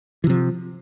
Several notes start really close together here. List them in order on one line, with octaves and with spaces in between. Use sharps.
E3 C3 F3